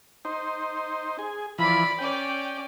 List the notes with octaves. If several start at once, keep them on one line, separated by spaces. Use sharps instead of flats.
D#4 C5
G#4
E3 F3 D5 B5
C#4 D5 G5